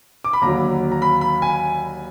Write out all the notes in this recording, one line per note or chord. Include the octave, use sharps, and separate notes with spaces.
D6
B5
D#2 D3 F#3 A#5
A#5
B5
B5
G#5